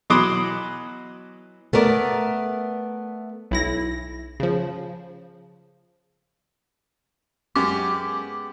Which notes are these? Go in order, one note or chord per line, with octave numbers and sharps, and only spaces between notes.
B2 E3 F#3 C6 D6 D#6
A3 B3 A#4 D5
B1 E4 A#6
C#3 F3
F#2 G#3 B3 G4 D6